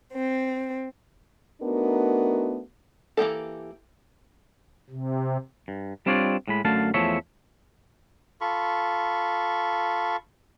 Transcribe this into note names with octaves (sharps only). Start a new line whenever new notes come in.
C4
A3 B3 D4 D#4 F#4 A#4
E3 A#3 G4 A4
C3
G2
G3 C4 D4 F4 C#5 D5
A2 G#3 B5
F#2 D3 A3 F5 A5
E2 F3 A3 A4 C#5 E5
F4 A4 B5 C#6